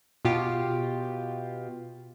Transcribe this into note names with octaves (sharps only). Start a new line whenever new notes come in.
B2 F4 G4